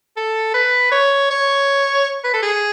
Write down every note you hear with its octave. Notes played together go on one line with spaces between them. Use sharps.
A4
B4
C#5
C#5
B4
A4
G#4